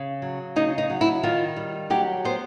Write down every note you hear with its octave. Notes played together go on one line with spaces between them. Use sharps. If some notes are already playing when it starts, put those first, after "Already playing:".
Already playing: C#3
F#3
C#3 D#4
D#4
F#3
E4
D#3 F4
G3
F#3 G4
B3 C5